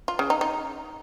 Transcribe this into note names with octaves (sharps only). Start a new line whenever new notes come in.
F4
C#3
D#4
D#4